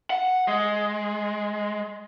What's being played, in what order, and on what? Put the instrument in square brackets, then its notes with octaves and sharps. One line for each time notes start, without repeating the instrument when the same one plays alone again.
[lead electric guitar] F#5
G#3